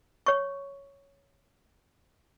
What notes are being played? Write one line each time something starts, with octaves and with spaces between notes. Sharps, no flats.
C#5 C#6